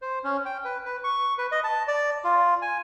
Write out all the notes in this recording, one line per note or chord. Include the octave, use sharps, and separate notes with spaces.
C5
C#4
G5
B4
B4
C#6
B4
D#5
A5
D5
F4
G#5